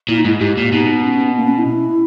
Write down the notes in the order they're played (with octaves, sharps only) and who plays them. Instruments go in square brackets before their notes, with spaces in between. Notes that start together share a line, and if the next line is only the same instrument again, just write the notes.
[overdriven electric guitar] A#2 [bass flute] E4
[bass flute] D#4
[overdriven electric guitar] G#2 [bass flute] E4
[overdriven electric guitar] G#2 [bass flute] G4
[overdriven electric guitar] A#2
[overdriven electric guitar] B2 [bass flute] D#4
[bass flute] C#4
B3
A#3
B3
C#4
E4